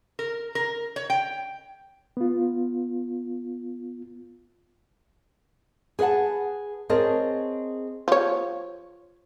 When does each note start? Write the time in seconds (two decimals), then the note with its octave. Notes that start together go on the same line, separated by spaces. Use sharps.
0.19 A#4
0.55 A#4
0.96 C#5
1.10 G5
2.17 B3 F4
5.99 G#4 B4 D#5 F#5 A5
6.89 C4 G#4 A#4 C#5 D#5 A5
8.08 F3 C#5